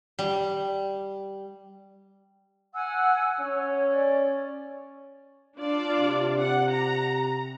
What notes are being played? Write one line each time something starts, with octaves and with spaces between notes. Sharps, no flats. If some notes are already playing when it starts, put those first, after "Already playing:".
G3
F#5 G#5 E6
C#4 C#5
D5
D4 F4 D5
C3
F#5
A#5